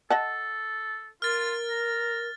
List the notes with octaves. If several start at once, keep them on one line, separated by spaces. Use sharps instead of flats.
A4 D#5 F#5 A5
F4 A#4 F6 A6
A#5